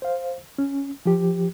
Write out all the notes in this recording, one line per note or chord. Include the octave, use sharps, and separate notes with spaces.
C5 F5
C#4
F3 G4